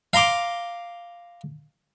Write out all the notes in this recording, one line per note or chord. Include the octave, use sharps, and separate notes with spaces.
F5 A#5 C6 D6